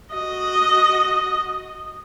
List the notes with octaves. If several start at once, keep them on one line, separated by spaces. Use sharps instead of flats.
F#4 D#5